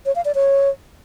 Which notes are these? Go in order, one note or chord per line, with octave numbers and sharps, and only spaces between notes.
C#5
F5
D5
C#5